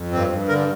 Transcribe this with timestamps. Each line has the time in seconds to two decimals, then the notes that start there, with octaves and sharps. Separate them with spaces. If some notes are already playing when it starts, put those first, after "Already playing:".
Already playing: F2
0.11 G2 C4
0.31 G2
0.48 D3 A#4